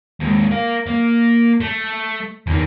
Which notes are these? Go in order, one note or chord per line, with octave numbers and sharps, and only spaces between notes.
D#2 G#3
A#4 F5
A#3
A3
E2 D#3